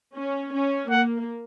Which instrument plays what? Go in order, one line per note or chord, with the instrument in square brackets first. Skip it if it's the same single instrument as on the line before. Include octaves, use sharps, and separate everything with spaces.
[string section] C#4
C#4
[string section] A#3 [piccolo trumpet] F#5